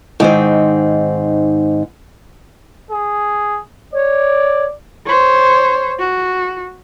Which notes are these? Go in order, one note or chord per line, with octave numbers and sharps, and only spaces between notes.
G#2 D#3 C4
G#4
C#5 D5
C5 C#5
F#4